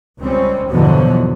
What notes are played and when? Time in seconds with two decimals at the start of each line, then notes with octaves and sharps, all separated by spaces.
0.18 C#2 G3 C4 C#4
0.70 E2 G2 B2 D3 F3 F#3